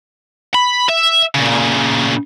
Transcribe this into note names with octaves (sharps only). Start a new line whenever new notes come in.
B5
E5
A#2 C#3